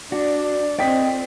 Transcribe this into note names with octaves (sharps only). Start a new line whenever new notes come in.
D4 F#4 D5
C4 F4 A4 D5 D#5 G5 B6